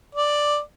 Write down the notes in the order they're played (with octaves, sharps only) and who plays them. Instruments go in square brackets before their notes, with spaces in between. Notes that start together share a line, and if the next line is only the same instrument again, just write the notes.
[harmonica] D5